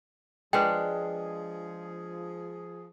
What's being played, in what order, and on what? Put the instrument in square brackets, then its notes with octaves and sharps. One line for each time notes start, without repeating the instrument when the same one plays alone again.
[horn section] F3 G#4 [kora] G#3 D4 [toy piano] B4 G5